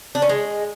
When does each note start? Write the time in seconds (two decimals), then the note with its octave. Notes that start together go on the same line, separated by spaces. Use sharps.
0.15 D4
0.22 C#4
0.29 G#3